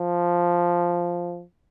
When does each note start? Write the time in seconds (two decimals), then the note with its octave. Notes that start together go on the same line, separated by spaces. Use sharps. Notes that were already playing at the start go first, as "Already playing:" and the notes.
Already playing: F3